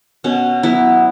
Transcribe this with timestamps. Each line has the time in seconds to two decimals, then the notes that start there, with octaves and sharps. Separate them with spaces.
0.24 B2 C#4
0.63 F#3 B3 E4